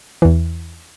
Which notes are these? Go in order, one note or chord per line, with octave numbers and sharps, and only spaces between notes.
E2 E3